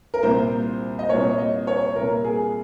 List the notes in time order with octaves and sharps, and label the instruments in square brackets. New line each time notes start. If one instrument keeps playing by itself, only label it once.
[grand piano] A#4
C2 A#2 C5
D#5
C2 A#2 C#5
D#5
C#5
C2 A#2 A#4
G#4